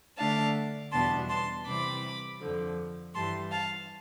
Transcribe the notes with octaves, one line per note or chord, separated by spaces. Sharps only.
D3 A3 D4 F5 A5
E2 B2 G3 B3 D4 A5 C6
A5 C6
C3 E3 G3 C4 B5 D6
F2 D3 F3
G2 E3 G3 A5 C6
F5 A5